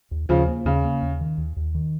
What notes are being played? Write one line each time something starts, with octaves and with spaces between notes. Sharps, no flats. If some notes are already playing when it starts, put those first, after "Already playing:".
D#2
D#2 C#3 F3
A#3
D#2 C#3
A#3
D#2
D#3
D#2
D#2
D#3